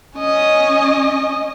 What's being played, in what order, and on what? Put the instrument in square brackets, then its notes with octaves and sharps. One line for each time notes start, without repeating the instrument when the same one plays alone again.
[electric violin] C#4 D#5